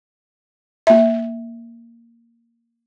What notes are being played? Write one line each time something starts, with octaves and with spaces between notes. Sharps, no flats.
A#3 E5